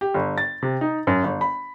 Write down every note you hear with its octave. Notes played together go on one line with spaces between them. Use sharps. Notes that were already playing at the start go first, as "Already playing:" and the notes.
G4
G1
A6
C3
D#4
F#2
G1
B5